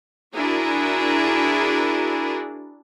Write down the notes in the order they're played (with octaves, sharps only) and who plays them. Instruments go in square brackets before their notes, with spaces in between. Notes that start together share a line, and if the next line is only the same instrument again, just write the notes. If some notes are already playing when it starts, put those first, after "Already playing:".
[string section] D4 E4 F#4 G#4 A#4